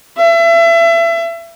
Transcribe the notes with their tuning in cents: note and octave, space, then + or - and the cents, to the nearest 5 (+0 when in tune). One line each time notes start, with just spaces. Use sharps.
E5 +30